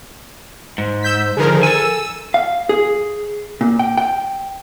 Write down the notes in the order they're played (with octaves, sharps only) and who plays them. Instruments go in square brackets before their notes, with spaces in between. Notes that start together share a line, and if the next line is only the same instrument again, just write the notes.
[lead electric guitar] G#2
[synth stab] E6 G6 B6
[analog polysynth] D3 D#3 F3 [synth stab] G#4 A#4
[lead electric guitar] A4 G#5 [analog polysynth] E6
[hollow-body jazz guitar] F5
G#4
A#2
G5
G5